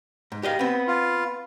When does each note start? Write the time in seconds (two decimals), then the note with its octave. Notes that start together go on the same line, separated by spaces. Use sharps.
0.32 G#2
0.43 G4 D#5 F5
0.59 B3 C4
0.87 F4